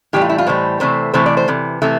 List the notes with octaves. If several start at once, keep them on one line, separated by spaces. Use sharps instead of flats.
A2 E3 G3 G4
F4
E4
F4
A2 E3 G3 C5
C3 E3 A3 C5
C3 E3 A3 C5
D5
C5
C3 E3
C3 E3 A3